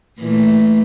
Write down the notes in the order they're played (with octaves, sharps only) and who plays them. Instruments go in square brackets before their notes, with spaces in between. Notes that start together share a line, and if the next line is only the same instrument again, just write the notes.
[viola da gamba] A#2 E3 A3